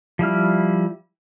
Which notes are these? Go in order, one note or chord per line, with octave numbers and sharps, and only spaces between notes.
F3 G3 E4 F6